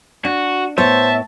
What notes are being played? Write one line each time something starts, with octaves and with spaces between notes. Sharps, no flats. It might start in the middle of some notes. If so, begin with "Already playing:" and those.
D4 F#4
A2 B3 C5 C#5 E5 A5